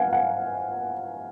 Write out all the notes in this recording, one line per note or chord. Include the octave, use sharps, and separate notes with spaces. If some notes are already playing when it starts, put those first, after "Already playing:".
Already playing: F5 F#5 G#5
F#5